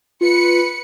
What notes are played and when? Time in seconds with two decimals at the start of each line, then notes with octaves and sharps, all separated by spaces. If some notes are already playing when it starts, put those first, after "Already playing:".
0.21 F4 B4 C#7